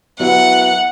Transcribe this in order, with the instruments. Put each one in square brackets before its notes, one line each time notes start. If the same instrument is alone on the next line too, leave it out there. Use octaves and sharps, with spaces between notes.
[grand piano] F#3 B3 E4 [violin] F#5